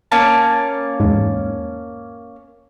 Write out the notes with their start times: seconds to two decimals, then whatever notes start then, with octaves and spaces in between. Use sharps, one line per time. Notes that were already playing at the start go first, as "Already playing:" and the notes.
0.12 A#3 C#4 A5
1.00 E2 G#2